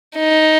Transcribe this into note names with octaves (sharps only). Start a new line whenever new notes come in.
D#4